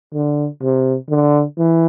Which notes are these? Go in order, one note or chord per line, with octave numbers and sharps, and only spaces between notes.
D3
C3
D3
E3